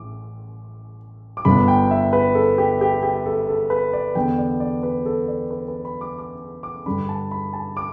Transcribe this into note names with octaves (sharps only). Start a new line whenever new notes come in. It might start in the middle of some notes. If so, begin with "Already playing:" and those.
Already playing: A1 A2 D6
D6
G1 G2 D3 B3 D4 B5
G5
E5
B4
A4
G4
G4
G4
A4
A4
B4
D5
E2 D3 B3 D4 G5
D5
D5
B4
A4
D5
B4
B4
B5
D6
D6
D6
G2 D3 G3 D4 B5
A5
B5
A5
D6